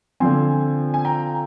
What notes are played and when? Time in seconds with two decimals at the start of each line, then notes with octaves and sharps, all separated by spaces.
0.20 D3 F3 C4 G#5 C6
0.94 G#5
1.05 G5 A#5